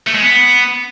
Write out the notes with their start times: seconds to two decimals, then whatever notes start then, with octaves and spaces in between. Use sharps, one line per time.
0.07 A3
0.15 G#3
0.22 B3